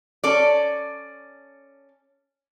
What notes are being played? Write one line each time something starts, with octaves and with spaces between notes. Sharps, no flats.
C#4 A4 D5